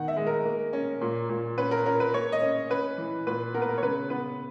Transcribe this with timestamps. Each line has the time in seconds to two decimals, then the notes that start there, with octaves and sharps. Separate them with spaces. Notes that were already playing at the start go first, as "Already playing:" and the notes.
Already playing: D#3 B3 F#5
0.08 E5
0.17 G#3
0.27 A#4
0.45 A#3
0.73 C#4
1.01 A#2
1.29 A#2
1.58 C#4 B4
1.71 A#4
1.86 C#4 A#4
2.00 B4
2.14 A#3 C#5
2.32 D#5
2.42 C#4
2.70 C#4 B4
2.98 E3
3.27 A#2 B4
3.54 B3 A#4
3.62 B4
3.69 A#4
3.78 C#5
3.83 C#3 B4
4.10 B3 B4